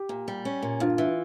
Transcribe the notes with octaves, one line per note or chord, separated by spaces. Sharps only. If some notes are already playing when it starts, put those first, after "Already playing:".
Already playing: G4
A#2
G3
C#4
A#2
G2 F4
E3